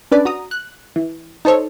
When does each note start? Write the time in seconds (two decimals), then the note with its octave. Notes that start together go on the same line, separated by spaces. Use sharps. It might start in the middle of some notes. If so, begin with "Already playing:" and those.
0.11 C#4 D4 B4 D5
0.25 F#4 A#5 D#6
0.51 F#6
0.96 E3
1.45 D#4 A4 C5 C#5